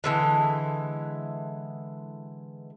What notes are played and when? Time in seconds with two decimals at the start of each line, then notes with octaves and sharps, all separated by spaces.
0.04 D3 E3 G#3